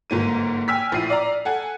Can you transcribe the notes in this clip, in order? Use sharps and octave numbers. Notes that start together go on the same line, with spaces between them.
G1 G#2 A#3 D#7
G5 G#5 E6 F6 B6
A#1 A2 C7 D#7
D5 A#5
A4 F#5 G#5